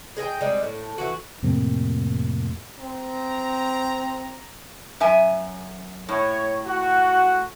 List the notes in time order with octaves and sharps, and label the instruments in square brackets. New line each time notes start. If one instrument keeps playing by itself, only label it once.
[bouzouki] G#4 D#5 E5 G5
G3 G#3 C4 D#4
A2
E3 F#4
[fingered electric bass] F2 A2 C3 A#3
[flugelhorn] C4 [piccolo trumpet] A#5
[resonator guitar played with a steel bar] F#2 E5 G#5
[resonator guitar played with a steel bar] A2 [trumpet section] C#5
[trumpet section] F#4